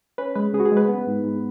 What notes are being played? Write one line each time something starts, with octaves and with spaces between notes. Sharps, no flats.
C#4 B4
G#3 B4
C#3 G#4
F#4
G#4
G#3
B4
B3
G#2
G#2